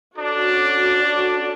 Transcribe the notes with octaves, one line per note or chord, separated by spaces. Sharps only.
C#4 D4 F#4 A4 D5